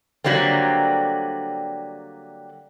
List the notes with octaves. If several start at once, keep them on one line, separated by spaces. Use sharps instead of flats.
D3 F#3 G3 A#3 C4